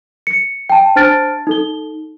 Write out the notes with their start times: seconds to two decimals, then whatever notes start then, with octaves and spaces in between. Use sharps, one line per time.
0.27 C#7
0.70 G5 A5
0.96 D4 C5 A5 F6 A6 D7
1.47 D#4 A4 G7